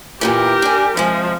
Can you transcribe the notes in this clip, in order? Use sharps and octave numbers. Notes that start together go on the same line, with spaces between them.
E2 A#2 E3 G4 A#4
D4 G#5
C3 F3 G#3